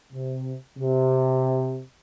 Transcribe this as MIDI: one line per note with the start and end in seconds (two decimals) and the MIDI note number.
0.13 0.54 48
0.79 1.82 48